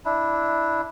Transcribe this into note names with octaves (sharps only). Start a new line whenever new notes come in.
D4 E4